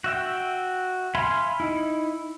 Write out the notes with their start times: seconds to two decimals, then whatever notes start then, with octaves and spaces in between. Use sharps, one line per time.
0.04 F#4 E5 G5
1.15 E5 F5 G#5 B5 C6
1.60 D#4 E4